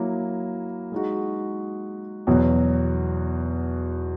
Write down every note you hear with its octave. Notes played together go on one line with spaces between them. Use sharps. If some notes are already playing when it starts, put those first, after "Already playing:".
Already playing: F#3 A#3 E4
G#3 D#4 F#4
E2 B2 F#3